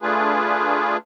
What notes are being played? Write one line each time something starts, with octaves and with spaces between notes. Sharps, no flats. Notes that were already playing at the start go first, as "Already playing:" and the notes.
A3 D4 F4 G#4 B4